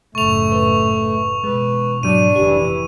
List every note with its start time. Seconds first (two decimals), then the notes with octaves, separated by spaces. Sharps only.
0.15 F#1 A2 A3 C#6 F7
0.52 B4
1.44 B2 E3 G#3 B4
2.03 G#2 F#3 D4 D#7
2.35 F1 E3 G4